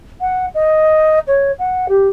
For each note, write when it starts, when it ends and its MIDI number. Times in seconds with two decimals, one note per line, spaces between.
0.21 0.46 78
0.55 1.19 75
1.27 1.51 73
1.59 1.86 78
1.89 2.08 67